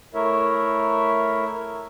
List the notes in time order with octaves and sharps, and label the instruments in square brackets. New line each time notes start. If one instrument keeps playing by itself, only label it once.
[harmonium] A3 E4 A#4 C#5 E5